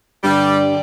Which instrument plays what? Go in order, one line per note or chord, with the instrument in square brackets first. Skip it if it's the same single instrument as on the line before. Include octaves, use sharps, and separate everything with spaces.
[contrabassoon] G2 [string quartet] D3 G4 D5 [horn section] G3